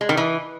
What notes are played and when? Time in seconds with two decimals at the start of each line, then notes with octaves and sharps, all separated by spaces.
0.01 G#3
0.09 D#3
0.17 E3